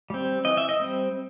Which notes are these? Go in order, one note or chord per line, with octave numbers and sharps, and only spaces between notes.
G3 C4
E3 D#5
E5
D#5
G3 C4